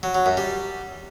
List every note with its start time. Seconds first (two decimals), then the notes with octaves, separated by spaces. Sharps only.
0.03 F#3
0.15 F#3
0.26 F#2
0.37 G3